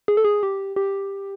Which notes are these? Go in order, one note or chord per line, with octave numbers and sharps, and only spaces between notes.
G#4
A4
G#4
G4
G4